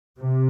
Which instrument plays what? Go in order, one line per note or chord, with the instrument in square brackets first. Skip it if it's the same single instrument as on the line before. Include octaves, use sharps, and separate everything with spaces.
[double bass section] C3